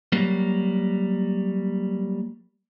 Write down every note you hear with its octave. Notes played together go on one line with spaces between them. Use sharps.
F#3 G3 A#3